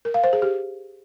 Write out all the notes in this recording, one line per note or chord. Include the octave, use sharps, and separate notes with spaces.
A#4
F5
C5
G#4
G4